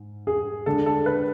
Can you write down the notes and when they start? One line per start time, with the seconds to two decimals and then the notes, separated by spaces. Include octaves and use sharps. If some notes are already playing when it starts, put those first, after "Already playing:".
Already playing: G#2
0.27 G#4
0.66 D3 G#3 D4 A4
0.86 A4
1.06 B4